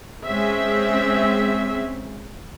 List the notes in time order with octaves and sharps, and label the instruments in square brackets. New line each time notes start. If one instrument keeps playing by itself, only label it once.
[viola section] G#3 C4 C#4 E5